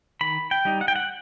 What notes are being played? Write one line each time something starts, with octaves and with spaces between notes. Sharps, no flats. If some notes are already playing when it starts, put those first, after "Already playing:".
D#3 B5
G5
G3 D#4
F#5
G5
F#5